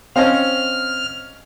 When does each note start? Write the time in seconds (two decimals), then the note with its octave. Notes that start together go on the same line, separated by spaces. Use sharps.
0.16 C4 C#4 C5 D#5 F5 F6